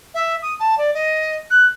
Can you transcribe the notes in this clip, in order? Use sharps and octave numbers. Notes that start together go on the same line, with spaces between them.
E5
D#6
A5
D5
D#5
F#6